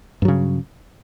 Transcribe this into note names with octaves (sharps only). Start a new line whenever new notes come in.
G2 C#3 F#3